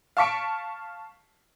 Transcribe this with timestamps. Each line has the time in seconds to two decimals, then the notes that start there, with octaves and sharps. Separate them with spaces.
0.17 F5 A5 C#6 B6 C#7 D7